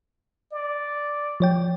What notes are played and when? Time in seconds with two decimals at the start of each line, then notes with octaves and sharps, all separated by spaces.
0.52 D5
1.40 F3 C#5 G5